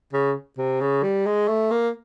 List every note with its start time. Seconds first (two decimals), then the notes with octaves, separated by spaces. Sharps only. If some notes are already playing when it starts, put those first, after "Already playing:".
0.13 C#3
0.58 C3
0.81 C#3
1.03 G3
1.27 G#3
1.48 A3
1.71 A#3